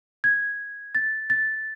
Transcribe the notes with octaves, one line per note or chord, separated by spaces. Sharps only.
G#6
A6
A6